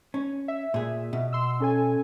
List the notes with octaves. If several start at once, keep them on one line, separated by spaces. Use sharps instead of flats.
C#4
E5
A#2 G#4
B2
C6 E6
C#4 A4 G#5